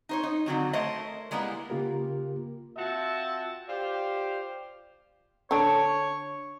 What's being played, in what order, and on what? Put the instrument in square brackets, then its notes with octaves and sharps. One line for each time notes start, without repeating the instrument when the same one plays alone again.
[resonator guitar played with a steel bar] D#4 C5 C#5
D#4
D3 D#3 F#3 C4
A3 A#4 C5 C#5 D#5
G3 G#3 A#3 B3 E4
[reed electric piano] C#3 A#3 F4 G4 A#4
[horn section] C4 F4 F#4 E5 A5
F4 G4 C5 D5 F5
[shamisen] D3 D4 [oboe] C#5